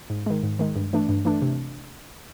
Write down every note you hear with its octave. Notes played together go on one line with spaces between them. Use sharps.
G#2
D#3 G#3
G#2
D#3 G#3
G2
E3 A3 D4
G2
E3 A3 D4
C3